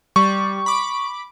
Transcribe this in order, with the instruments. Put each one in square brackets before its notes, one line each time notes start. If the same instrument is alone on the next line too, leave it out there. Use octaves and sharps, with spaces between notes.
[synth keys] G3 [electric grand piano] C#6
[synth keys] B5 D6